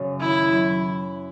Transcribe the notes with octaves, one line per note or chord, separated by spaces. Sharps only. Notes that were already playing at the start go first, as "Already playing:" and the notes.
Already playing: F#2 C#3
D#3 E4
F#3